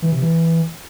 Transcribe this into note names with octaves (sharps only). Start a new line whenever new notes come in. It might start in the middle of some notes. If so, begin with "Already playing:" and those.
E3
C3
E3